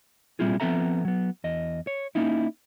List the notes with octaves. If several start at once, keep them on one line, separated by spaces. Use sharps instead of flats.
A#2 G3 C4 E4 F4 G#4
F3 B3 C4 A4 E5 A#5
F#3 B3
E2 D#5
C#5
A#3 C#4 D#4 E4